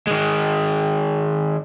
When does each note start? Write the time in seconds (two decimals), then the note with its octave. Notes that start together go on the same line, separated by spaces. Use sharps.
0.07 D#3 G#3